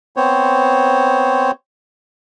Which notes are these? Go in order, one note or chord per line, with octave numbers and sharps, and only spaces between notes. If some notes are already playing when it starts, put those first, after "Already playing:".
B3 C4 C5 C#5